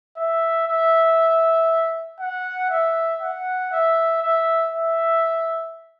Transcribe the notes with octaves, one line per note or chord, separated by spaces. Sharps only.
E5
E5
F#5
E5
F#5
E5
E5
E5